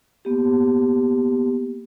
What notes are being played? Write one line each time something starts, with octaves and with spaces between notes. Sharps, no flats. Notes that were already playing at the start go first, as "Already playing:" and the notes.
A#3 B3 G4